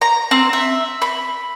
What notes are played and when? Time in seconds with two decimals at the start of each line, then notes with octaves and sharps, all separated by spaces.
0.01 A#5
0.31 C4
0.53 E5
1.02 B5